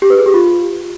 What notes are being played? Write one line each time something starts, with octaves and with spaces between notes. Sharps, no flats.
G4
B4
G#4
G4
F4